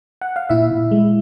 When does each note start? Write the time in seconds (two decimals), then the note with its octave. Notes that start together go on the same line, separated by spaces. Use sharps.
0.22 F#5
0.36 F5
0.49 A#2 E4 E5
0.71 A#2
0.91 G#3